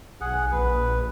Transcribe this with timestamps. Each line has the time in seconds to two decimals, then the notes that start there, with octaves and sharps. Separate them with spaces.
0.21 B1 G#4 F#5
0.52 A#1 B4